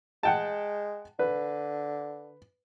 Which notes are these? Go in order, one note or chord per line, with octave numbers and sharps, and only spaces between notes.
G#3 F#5 G5 A5
D3 B4